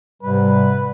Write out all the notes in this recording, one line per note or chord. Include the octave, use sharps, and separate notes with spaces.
G#2 C3 G3 B4